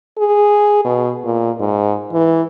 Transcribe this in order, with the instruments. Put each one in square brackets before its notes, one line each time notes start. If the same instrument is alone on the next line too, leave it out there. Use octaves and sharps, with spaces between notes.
[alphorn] G#4
B2
A#2
G#2
E3